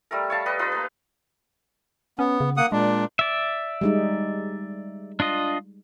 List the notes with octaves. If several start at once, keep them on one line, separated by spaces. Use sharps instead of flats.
G3 A3 A#4
C#5 F5 A5
G4 B4 D5 D#5
D#4 F4 B4 D#5
A#3 B4
B3 C#4
C#3
A#3 F#5 D#6
A#2 G#3 D4
D5 E5
G3 G#3 D#4
D4 F4 D#5